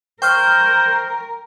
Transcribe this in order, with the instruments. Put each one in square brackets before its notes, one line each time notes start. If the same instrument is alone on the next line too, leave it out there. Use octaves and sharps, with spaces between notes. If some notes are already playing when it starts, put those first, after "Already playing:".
[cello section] A#4 [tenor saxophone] C5 [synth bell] G5 C#6 F6